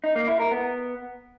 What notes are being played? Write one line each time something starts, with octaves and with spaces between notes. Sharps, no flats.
D#4
A#3
E4
A#4
B3